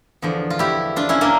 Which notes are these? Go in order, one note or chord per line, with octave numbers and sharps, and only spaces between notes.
E2 D3 F3
F4
E4 G4
D4 F4
C#4 E4
A#3 D4